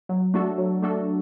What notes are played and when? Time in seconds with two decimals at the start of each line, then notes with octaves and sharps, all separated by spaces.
0.09 F#3
0.34 A3 D4 F#4 A4
0.58 F#3
0.82 A3 D4 F#4 A4